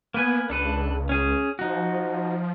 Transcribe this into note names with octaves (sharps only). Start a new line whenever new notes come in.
A#3 B3 B4 G#5
C#2 D4 A4 B4
C#4 G#4
F3 D#4 F#4